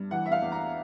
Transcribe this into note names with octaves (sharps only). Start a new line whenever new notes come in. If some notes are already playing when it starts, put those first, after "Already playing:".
Already playing: G2
E3 F#5
E5
F5
E2
A#5